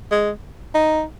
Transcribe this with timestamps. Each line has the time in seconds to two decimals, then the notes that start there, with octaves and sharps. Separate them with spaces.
0.12 G#3
0.75 D#4